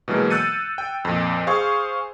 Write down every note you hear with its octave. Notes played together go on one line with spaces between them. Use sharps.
B2 E3 F#3 G#3 A#3
E6 F#6 G6 A6 C#7 D#7
G5
F2 A#2
G#4 C5 F5 G#5 C#6